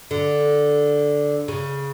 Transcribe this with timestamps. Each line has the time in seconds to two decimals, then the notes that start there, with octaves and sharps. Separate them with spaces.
0.11 D3
1.48 C#3